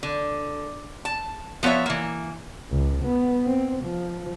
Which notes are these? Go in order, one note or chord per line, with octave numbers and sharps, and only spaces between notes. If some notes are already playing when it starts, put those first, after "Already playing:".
D3
A5
F3 B3 B4 C#5 E5
E3 A#3
C#2
B3
C4
F3